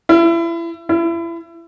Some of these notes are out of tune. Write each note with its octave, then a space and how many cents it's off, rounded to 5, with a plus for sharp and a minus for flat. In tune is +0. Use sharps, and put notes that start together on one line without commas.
E4 +30
E4 +30